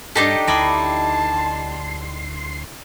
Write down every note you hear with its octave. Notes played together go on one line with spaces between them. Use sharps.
G2 D4 D#4 G4 A4 D#5 A5
D2 E4 D5 D#5 A5 C6